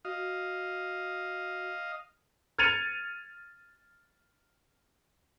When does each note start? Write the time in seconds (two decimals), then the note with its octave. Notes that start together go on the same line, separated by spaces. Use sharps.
0.05 F#4 D#5 F5
2.58 F6 G#6 A6 C#7 D#7 F7